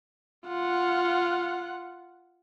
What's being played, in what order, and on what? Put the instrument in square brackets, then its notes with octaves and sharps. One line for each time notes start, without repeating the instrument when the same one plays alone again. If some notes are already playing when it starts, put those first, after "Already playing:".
[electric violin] F4 F#5